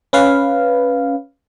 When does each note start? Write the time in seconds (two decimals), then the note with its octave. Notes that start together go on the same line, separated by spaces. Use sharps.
0.13 C#4 B4 F5